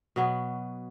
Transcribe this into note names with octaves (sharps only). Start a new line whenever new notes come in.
B2 F#3 B3